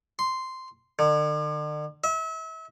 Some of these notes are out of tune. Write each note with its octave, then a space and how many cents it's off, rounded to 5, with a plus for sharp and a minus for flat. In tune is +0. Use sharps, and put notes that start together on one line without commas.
C6 -5
D3 +40
E5 -35